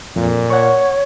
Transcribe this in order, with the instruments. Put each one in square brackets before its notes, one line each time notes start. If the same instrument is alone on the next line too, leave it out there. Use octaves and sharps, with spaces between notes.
[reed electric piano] F2 [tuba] A#2
[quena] C#5 [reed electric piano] F#5 C#6